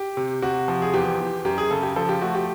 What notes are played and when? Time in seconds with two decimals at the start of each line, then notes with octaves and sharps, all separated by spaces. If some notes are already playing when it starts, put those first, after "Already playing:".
Already playing: G4
0.17 C3
0.42 C3 F#4
0.68 F3
0.82 G#4
0.94 E2 G4
1.20 E2
1.45 F#2 G4
1.58 G#4
1.70 C#3 A4
1.83 G4
1.96 F3 A4
2.09 G4
2.22 A3 F#4
2.35 G4